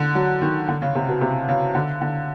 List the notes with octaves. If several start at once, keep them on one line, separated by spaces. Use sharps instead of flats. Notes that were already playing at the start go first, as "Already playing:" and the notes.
Already playing: D3
F#3
D#3
D3
C#3
C3
B2
C3
C#3
D3
D3